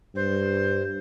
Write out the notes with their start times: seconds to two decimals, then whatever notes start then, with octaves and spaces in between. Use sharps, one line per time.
0.15 G2 C5